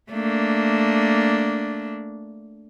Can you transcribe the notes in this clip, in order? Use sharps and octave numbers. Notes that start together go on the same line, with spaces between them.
A3 A#3 D4